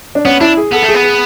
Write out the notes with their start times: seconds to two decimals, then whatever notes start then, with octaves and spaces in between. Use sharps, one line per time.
0.15 D4
0.25 B3 C#4
0.41 D4 E4
0.57 G#4
0.73 B3 A4
0.84 A3 G#4
0.95 B3
1.04 G#4